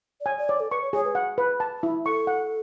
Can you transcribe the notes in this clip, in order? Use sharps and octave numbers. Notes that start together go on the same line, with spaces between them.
D5
C#5 G#5
D5
C#5 D5
A4
B4 C#6
C#5
G#4 C#5
B4
F#5
B4
A5
E4
A4 C#6
F#5